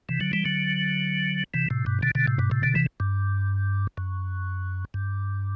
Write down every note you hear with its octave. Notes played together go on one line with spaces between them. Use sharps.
C3 E3
D3 F#3
E3 G3
D3 F#3
C3 E3
A2 C3
G2 B2
B2 D3
B2 D3
A2 C3
G2 B2
A2 C3
B2 D3
C3 E3
G2
F#2
G2